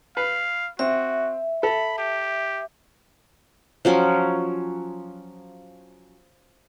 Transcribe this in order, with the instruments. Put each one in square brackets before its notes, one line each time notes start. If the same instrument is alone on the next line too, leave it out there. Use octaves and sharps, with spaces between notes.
[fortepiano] B4 [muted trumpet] F5
[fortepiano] C4 [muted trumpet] F#4 [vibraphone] E5
[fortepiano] A4 [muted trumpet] B5
[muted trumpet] G4
[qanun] F3 F#3 C#4